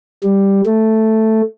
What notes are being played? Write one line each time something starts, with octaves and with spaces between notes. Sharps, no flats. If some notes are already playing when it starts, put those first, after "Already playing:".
G3
A3